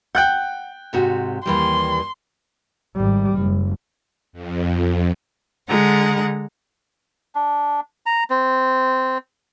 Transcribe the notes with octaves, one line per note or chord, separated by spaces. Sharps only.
F#5 G5 F#6 G6
G#2 C3 F#4
D#2 E3 G3 C6
G#1 G3
F#1
F2
D3 G#3 F#5 A#5
D4
A#5
C4